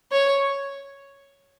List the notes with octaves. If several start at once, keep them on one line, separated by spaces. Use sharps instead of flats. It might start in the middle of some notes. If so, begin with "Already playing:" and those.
C#5